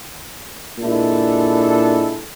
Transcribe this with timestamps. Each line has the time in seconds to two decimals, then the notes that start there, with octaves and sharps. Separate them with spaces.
0.78 A#2 G#3 D4 E4 A4